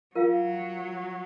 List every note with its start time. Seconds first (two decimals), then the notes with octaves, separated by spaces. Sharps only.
0.16 F#3 F4 A#4 F5